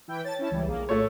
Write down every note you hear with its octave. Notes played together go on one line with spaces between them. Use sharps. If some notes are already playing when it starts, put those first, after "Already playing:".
E3 E4 G5
C#5 A5 A6
C#4 E4 C#5 A5
C#2 E3 G3
A#1 A#3 G#4
A2 A3 A4 C#5